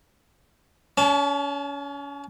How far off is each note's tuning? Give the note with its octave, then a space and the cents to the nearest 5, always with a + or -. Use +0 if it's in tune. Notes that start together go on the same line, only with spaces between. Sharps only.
C#4 +30 A5 -20